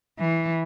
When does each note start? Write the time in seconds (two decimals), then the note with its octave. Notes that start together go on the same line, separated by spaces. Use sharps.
0.18 E3